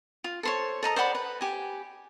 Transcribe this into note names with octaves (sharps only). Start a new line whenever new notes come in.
F4
A4 C5 C#5
A4 D#5 A#5 D#6
C5 D5 F#5 B5
B4
G4 G#5